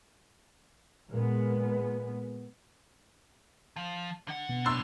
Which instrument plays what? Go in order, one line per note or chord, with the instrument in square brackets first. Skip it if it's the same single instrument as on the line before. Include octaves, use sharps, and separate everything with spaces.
[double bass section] A#2 G#3 B3
[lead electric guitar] F3
D3 F#5
[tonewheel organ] B2
[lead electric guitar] A2 D4 [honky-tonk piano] C6 E6